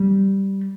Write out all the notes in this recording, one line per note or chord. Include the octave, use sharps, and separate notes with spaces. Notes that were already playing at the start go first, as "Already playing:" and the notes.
Already playing: G3